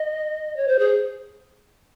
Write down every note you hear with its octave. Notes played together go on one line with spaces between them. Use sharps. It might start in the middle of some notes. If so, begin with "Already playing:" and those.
Already playing: D#5
C#5
C5
G#4